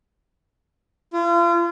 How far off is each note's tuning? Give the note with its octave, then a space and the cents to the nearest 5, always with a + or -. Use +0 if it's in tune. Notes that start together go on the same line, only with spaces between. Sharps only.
F4 -35